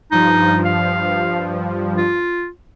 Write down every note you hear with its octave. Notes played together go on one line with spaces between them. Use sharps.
G2 F3 D#4
F5
F4